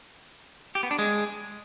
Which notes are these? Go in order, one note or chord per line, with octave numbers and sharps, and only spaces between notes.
G4
B3
D4
G#3